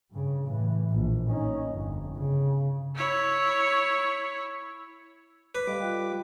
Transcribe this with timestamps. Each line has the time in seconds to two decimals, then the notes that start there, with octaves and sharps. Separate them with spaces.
0.11 G2 C#3
0.45 A2 E3
0.90 A#1
1.29 C#4 D#4
1.70 G1 F2
2.16 C#3
2.95 E4 C#5
5.55 B4 D6 F#6
5.67 G3 A4 D#5 F5 D6
5.81 F4 G5